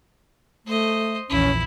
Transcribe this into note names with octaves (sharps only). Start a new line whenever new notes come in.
A3 C5 D#5
A#1 E2 C#4 E4